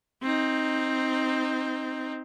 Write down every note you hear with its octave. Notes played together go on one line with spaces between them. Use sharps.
C4 D#4